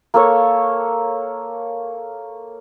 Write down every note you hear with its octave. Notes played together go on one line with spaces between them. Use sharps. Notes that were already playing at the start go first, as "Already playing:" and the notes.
A#3 A4 C#5